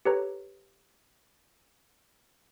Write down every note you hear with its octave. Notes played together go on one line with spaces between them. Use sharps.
G4 A4 B4 C#5 A#5